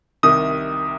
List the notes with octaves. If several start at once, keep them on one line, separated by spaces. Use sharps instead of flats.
C2 C3 D#3 D#6